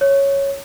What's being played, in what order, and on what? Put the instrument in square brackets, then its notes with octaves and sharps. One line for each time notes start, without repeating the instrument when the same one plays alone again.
[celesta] C#5